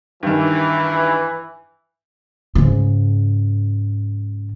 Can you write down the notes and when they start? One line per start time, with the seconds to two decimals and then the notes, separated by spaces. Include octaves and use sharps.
0.23 G2 D#3 E3
2.55 G#2 C#3